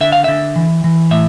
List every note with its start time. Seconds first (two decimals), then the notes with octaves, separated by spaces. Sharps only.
0.01 D3 E5
0.12 F5
0.24 D3 E5
0.56 E3
0.84 E3
1.11 A2 E5